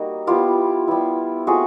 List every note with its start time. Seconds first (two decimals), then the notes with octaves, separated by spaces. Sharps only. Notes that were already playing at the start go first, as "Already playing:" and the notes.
Already playing: G3 A#3 D#4 F#4
0.27 G3 B3 E4 F4 G4
0.88 G3 B3 E4
1.47 A3 C4 F4 F#4 G#4